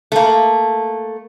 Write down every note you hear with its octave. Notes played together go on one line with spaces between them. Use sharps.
A3 A#3